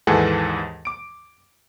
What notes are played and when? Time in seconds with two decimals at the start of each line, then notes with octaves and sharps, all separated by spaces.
0.07 D#2 G#2 E3 G#4 A4 F#5
0.85 D6 D7